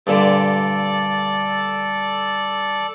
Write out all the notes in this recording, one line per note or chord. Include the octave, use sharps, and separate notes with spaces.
G2 A#2 D3 A4 D5